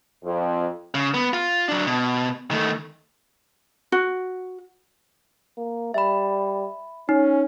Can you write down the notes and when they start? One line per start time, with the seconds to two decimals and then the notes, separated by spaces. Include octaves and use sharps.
0.24 F2
0.95 C#3
1.14 B3
1.33 F4
1.69 F#3 D4
1.87 B2
2.51 D#3 A3
3.92 F#4
5.57 A#3
5.94 G3 E5 B5
7.09 C#4 D#4